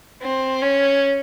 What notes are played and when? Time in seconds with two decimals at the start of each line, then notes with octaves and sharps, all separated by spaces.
0.22 C4
0.62 C#4